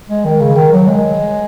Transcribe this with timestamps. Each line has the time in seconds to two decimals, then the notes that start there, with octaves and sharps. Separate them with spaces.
0.09 G#3
0.25 D#3
0.40 C#3
0.56 D#3
0.72 F#3
0.87 G#3